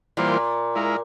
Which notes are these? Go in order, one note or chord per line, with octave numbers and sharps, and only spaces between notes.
A#2 E3 G3 A#3 F4 C5
G#3 E4 A#4 F5